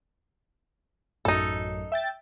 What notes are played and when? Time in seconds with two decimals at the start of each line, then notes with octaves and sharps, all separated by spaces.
1.25 A1 F#2 D#4 A4
1.92 E5 G5 A6